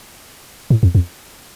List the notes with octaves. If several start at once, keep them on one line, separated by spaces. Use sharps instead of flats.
A2
F2
F2